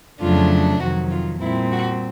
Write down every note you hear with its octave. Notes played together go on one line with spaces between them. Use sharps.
F2 C#3 F#3 A3 D4 F4
F2 C3 D#3 F#3 F#4
F4
A#2 G3 C4 E4
F#4